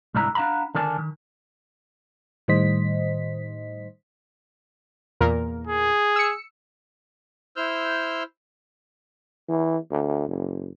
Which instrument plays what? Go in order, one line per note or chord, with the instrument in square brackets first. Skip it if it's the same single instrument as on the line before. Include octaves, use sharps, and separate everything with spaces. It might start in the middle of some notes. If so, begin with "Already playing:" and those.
[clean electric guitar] C2 G#2 D3 D4 E4 A#5
D4 F5 F#5 A#5 B5
D3 D#3 A#4 D5 G#5 A5
D#3
[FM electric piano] A2 D#3 G3 C5 D#5 B6
[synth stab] E2 A#2 A#4
[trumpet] G#4
[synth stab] E6 C#7
[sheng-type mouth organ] E4 C5 E6 F6 G6
[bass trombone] E3
D2
F#1